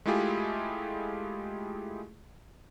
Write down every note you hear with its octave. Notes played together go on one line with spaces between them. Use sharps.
G#3 A3 E4 F4 G4 G#4